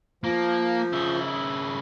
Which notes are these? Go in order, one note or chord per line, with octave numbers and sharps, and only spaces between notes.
F3 A#3
C#3 E4